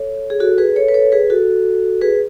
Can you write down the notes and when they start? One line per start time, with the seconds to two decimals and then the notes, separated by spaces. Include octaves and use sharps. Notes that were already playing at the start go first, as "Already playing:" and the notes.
Already playing: A4 C#5
0.30 G#4
0.40 F#4 A4
0.58 G#4 B4
0.76 A4 C#5
0.88 B4
0.94 A4 C#5
1.12 G#4 B4
1.30 F#4 A4
2.01 G#4 B4